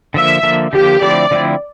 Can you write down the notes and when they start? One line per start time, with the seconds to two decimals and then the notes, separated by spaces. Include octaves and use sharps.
0.14 D3 F3 A#3 E5
0.43 D3 F3 A#3
0.73 D3 F3 A#3 G4
1.02 D3 F3 A3 C4 E4 D5
1.31 D3 F3 A3 C4 E4